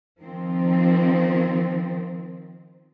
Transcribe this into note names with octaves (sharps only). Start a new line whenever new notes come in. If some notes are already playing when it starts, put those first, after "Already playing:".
D#3 F3 C4